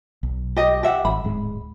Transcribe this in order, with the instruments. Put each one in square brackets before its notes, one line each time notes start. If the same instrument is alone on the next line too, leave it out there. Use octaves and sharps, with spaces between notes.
[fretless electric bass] B1
[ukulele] G4 D#5
G4 E5 F#5
[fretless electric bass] G#1 [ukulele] B5
[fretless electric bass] D1 G#2 G#3